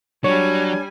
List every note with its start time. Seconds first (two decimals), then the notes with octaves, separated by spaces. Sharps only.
0.24 F#3 G3 D4 C#5 G#5